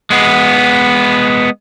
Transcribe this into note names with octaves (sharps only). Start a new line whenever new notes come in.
G#3 B3